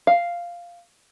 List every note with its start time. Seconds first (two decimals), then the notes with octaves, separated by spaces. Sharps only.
0.07 F5